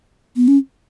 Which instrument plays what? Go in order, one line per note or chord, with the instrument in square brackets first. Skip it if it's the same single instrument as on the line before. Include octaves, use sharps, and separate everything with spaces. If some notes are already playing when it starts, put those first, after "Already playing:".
[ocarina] B3
C#4